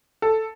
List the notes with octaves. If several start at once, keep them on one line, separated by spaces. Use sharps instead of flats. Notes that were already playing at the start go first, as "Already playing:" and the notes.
A4